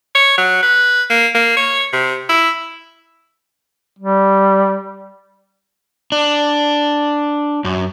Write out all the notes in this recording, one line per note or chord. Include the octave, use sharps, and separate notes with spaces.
C#5
F#3
B4
A#3
A#3
C#5
C3
E4
G3
D4
F#2